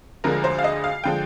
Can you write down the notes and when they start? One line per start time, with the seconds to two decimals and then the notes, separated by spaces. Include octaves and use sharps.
0.24 D2 D3 F3 G#3 A#4
0.44 C5
0.59 F5
0.64 D#5
0.84 F5
1.04 D3 F3 G#3 G5